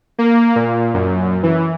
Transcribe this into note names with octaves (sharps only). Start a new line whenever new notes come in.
A#3
A#2
F#2
E3